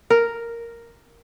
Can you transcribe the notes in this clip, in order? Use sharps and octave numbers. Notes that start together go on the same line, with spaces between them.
A#4